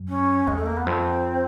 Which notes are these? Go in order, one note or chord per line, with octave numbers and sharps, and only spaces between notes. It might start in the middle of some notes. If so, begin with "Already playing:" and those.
Already playing: F#2
C#4
E2 G#3
A3
A#3
B3
F2 C4